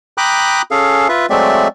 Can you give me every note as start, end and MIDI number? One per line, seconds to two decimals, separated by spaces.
0.18 0.62 79
0.18 0.62 82
0.18 0.62 83
0.18 0.62 86
0.18 0.62 87
0.18 0.62 90
0.71 1.08 61
0.71 1.08 68
0.71 1.08 69
0.71 1.08 77
1.09 1.26 65
1.09 1.26 71
1.09 1.26 76
1.30 1.68 54
1.30 1.68 56
1.30 1.68 57
1.30 1.68 60
1.30 1.68 74
1.30 1.68 76